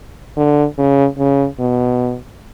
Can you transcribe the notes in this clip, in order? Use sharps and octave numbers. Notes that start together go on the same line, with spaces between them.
D3
C#3
C#3
B2